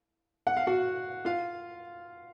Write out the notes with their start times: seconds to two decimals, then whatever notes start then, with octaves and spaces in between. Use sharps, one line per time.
0.47 F#5
0.57 F5
0.67 F#4 F#5
1.25 F4 F5